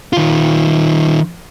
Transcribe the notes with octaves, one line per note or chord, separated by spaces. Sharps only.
D#3 F4